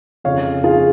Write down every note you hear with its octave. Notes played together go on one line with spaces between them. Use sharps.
F2 C#3 F3 C#5 F5
F4 G#4